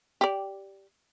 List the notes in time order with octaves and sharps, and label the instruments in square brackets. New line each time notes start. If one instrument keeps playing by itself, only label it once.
[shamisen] G4 D5